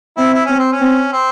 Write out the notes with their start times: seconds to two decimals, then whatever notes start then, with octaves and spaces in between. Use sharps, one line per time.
0.17 C4 E4
0.33 E4
0.46 C4 C#4
0.59 C4
0.72 C#4
0.80 C4
1.12 C4